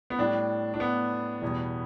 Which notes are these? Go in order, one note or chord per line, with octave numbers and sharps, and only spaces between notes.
B3
A2 G3 D4
D4
B3
E2 B2 G3